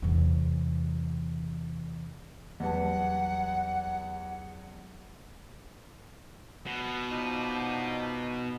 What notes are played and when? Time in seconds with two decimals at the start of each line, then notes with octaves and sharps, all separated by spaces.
0.02 E2 C3
2.60 E2 F#3 G3 B4 F#5 A5
6.66 B2
7.09 F3 D4 D#4